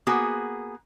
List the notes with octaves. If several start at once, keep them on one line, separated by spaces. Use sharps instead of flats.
A#3 B3 F#4 G#4